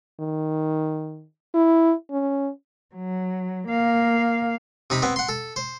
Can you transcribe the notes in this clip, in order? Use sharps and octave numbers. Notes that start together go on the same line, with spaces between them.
D#3
E4
C#4
F#3
A#3 F5
C3 D#4 B5
B3 C4
F#5 C6
A4
C5